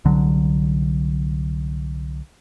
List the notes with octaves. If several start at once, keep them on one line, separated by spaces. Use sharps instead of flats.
C2 D3 F#3